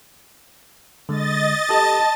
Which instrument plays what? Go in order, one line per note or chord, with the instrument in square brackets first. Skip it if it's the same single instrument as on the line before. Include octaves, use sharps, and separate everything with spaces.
[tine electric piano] D3 G#3 [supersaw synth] D#5 A6
[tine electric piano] G4 A4 D#6 [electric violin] A5